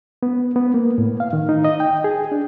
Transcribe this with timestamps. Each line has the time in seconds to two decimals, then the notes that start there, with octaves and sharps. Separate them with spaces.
0.23 B3
0.56 B3
0.74 A#3
0.98 A2
1.20 F5
1.33 D#3
1.49 D#4
1.65 D#5
1.80 G5
2.04 G#4
2.32 D4